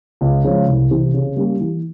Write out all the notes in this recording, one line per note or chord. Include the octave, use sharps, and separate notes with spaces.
C#2
C#3 F3 G#3
C2
C3 E3
C#3
G3 A#3 C#4 G4
E3